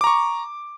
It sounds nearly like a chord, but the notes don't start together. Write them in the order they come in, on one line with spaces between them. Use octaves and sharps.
D6 A#5 C#6